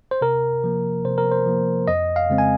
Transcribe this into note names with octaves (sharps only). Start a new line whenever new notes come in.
C5
C3 A#4
F3 A#3
C3 C5
A#4
C5
F3 A#3
F2 D#5
F5
C#3 G#3 C4
G#5